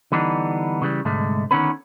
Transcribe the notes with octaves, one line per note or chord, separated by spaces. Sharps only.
D3 E3 G3 B3 D4 D#4
C#3 E3 G3
C2 G#2 D3 G#3 A3
D3 D#3 A3 B3 C#4 B4